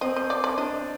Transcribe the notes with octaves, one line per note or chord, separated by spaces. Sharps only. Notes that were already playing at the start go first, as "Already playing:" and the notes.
C4 C5 D#5
D#5
D5
D5
D4 D5 D#5